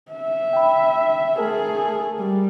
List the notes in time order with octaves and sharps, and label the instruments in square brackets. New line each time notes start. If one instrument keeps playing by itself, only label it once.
[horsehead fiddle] E5
[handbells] G5 B5
[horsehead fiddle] A3 G#4 [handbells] A#4 A5
[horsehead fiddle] G3